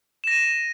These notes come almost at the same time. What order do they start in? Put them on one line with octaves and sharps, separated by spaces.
E7 A#6 D#7